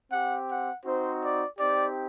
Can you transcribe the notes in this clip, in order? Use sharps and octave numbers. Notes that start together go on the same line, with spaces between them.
C4 G4 F#5
F#5
C4 D#4 F#4 C5
D5
C4 D#4 G4 D5